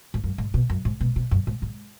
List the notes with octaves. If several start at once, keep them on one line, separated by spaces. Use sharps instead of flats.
G#2
F#2
G#2
B2
F#2
G#2
B2
B2
F#2
G#2
G#2